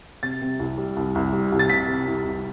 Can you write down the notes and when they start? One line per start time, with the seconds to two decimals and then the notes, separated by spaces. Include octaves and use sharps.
0.23 C3 A6
0.42 C3
0.59 C2
0.78 G3
0.96 C2
1.15 C2
1.33 G3
1.52 C2
1.59 A6
1.69 C3 B6
1.88 C3
2.07 C2
2.25 C2